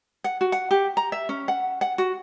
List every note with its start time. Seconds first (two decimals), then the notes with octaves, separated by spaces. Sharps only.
0.24 F#5
0.41 F#4
0.52 F#5
0.71 G4
0.97 A#5
1.12 E5
1.29 C#4
1.48 F#5
1.81 F#5
1.98 F#4